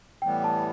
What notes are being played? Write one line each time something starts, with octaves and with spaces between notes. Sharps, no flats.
A2 E3 G3 B3 G5
A5